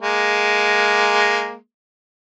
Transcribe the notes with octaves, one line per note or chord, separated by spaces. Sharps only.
G#3 A#3